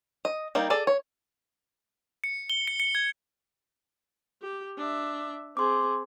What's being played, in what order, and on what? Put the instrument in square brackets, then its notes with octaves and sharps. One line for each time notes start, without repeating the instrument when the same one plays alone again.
[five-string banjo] D#5
G3 A#3 D#4
G#4 A4 D5
C#5
[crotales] C#7
G7
C#7
C#7
G#6
[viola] G4
D4 E5
[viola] C4 G#4 [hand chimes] C6 D6